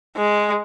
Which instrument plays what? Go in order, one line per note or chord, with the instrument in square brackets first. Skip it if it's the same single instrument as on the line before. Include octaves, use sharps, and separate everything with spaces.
[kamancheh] G#3